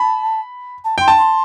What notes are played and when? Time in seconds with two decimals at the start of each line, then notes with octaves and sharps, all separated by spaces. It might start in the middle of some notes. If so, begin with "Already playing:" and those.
Already playing: A5 B5
0.84 A5
0.98 G5 C6
1.08 A5
1.17 C6